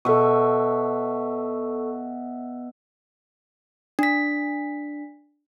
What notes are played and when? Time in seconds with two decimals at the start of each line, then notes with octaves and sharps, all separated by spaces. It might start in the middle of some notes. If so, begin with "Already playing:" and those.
0.05 B2 A4 E5 C#6
3.99 D4 B6